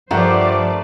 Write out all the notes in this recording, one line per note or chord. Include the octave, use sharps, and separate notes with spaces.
G2 F3 A3 G4 A#4 C5 D5 F#5